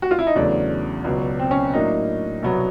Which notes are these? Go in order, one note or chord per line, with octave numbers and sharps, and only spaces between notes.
F#4
F4
E4
D#4
E2 C#3 F#3 A3 D4
C#2 B2 F#3
C4
C#4
A2 F#3 A#3 D4 D#4
C2 B2 F#3 B3